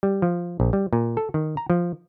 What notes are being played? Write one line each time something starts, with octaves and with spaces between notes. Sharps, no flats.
G3
F3
A#1
G3
A#2
A4
D#3
A#5
F3